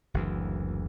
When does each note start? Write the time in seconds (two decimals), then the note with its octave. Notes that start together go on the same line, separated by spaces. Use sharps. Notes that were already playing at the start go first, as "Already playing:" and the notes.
0.14 F#1 D2 E3